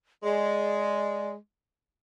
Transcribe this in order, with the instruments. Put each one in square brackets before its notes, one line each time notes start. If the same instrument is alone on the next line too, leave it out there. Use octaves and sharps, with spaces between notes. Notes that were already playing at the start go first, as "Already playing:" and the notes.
[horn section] G#3 [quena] D5